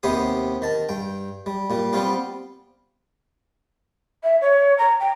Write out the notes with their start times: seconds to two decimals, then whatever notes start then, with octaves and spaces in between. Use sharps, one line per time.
0.03 D#2 C3 B3 G4 C5 D#6
0.62 D#3 A5
0.89 G2 G5
1.46 G3
1.70 A#2 G3
1.93 G3 B3 C4 F4 G4
4.23 E5
4.41 C#5
4.78 A#5
5.00 G5